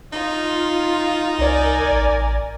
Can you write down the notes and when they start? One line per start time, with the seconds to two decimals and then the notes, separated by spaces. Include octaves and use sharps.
0.13 D#4 F4
1.38 C2 A#4 D5 G#5
1.90 A1